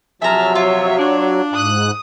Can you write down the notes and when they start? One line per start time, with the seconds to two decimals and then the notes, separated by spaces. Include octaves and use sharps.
0.22 C3 F3 F#3 G#4 E5 A5 A#5 F6
0.55 F4 C#5
0.98 D4
1.54 G#2 D#6 F#6